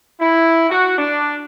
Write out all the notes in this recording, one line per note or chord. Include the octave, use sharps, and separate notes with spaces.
E4
F#4
D4